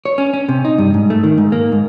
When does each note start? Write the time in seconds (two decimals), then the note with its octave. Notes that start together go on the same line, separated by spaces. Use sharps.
0.05 C#5
0.18 C#4
0.34 C#4
0.49 C3
0.65 D#4
0.78 G2
0.94 G#2
1.10 A3
1.24 D#3
1.38 G#2
1.52 A#3
1.72 G#2